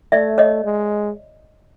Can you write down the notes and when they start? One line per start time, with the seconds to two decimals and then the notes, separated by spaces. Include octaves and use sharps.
0.12 A3 D5 E5
0.38 C#5 D#5
0.65 G#3